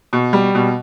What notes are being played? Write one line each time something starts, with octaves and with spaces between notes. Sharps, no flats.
B2
G3
B2